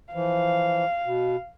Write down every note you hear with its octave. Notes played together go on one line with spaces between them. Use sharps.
E3 F3 F5
B2